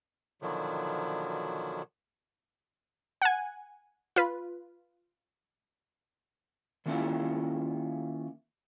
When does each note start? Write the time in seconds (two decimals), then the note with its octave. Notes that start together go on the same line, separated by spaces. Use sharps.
0.42 B2 D3 D#3 F3 F#3
3.22 F#5 G#5
4.16 F4 B4
6.86 D#3 F#3 A#3 C#4 E4 F4